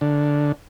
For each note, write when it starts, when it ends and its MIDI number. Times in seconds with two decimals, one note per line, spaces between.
0.01 0.52 50